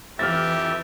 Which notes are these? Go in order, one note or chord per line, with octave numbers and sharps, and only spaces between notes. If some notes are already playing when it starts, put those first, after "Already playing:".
F2 E3 G4 E5 F6 A6